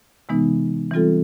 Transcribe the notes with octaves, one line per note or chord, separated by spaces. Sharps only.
C3 E3 G#3 B3 D#4
E3 G3 C4 F4 A4